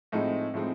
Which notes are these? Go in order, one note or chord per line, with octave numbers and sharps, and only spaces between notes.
A2 F3 G#3 C4 D#4
A2 F3 G#3 C4 D#4